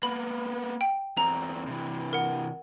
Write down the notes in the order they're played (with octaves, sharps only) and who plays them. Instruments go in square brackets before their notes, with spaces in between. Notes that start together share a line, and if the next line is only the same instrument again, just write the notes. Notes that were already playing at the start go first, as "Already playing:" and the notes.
[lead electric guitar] A#3 B3 [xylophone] B5
[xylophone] G5
[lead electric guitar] E2 C4 [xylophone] A#5
[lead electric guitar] C3 E3
[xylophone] A#4 F#5